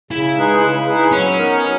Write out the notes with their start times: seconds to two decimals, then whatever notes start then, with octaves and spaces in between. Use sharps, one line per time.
0.11 C#3 E4
0.36 G#3 D#4 G#4 B4
0.61 C#3
0.87 G#3 D#4 G#4 B4
1.12 F#3 C#4
1.37 B3 D#4 A#4
1.63 F#3